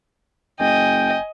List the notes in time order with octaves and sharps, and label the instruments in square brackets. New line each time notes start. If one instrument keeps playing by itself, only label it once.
[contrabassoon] F#1 [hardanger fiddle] D#5 [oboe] G5 [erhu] G#5